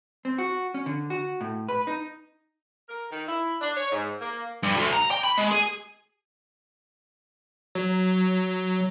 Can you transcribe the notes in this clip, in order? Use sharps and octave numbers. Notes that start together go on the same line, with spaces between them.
C4
F#4
C#4
D3
F#4
A2
B4
D#4
A#4
D#3
E4
D4
C#5
G#2
A#3
G2
D2
A#5
G5
B5
G#3
G#4
F#3